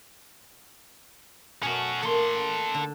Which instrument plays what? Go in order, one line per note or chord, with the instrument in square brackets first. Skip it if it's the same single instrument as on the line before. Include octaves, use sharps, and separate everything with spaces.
[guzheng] B2 A3 [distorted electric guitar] C#4 F#4
[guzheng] A3 A#3 [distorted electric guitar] A4 C6
[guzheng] D3